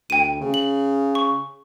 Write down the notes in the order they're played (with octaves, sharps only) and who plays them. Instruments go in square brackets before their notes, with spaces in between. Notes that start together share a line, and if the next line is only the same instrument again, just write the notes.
[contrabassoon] D2 [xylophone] G5 D#7
[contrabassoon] C#3
[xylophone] F#7
C#6